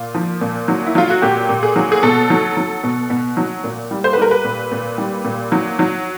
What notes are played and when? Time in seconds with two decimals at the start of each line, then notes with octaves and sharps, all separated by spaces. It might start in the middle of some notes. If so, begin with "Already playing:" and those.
Already playing: A#2 F4
0.15 F3
0.41 A#2
0.68 F#3
0.86 E4
0.95 F#3 F4
1.10 F#4
1.22 A#2 G4
1.49 A#2
1.63 G#4
1.76 F#3
1.92 G#4
2.03 B2 A4
2.30 F#3
2.57 F#3
2.84 B2
3.10 B2
3.37 F#3
3.64 A#2
3.91 G3
4.04 C5
4.13 B4
4.18 G3 A#4
4.31 B4
4.44 A#2
4.72 A#2
4.98 G3
5.25 A#2
5.52 F#3
5.79 F#3